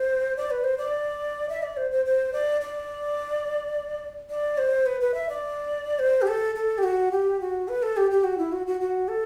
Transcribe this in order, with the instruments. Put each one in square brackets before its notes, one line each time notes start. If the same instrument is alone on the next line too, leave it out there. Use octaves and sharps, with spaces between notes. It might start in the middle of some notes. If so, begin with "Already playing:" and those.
Already playing: [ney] C5
D5
B4
C5
D5
E5
D5
C5
C5
C5
D5
D5
D5
C5
B4
B4
E5
D5
C5
G4
A4
A4
G4
F#4
G4
F#4
B4
A4
G4
G4
F#4
E4
F#4
F#4
F#4
A4